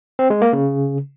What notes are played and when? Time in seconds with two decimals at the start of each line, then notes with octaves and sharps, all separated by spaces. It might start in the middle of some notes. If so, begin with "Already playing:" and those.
0.19 C4
0.30 G#3
0.42 A#3
0.53 C#3